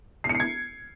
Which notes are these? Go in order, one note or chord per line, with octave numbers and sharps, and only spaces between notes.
C7
C#7
C7
G#6